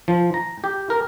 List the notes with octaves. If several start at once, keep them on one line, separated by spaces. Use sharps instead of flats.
F3
A#5
G4
A#4